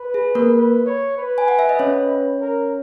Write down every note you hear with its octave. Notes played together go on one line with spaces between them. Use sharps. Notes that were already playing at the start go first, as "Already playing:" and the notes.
Already playing: B4
G#4
A#3 A#4
B4
C#5
B4
G#5
F#5
E5
D#5
C#4 C#5
A#4